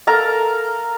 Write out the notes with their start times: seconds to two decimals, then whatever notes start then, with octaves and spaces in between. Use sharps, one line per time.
0.07 A4 A#4 F5 A#5